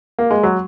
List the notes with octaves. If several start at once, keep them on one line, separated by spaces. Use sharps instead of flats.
A#3
G#3
F#3